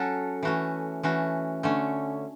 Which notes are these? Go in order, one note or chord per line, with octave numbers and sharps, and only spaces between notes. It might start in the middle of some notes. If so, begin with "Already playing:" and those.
Already playing: F#3 C#4 F#4 A4
E3 A3 C#4 F#4
E3 A3 C#4 F#4
D3 A3 C#4